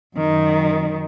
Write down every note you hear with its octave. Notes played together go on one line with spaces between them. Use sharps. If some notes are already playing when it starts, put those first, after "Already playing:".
F#2 D#3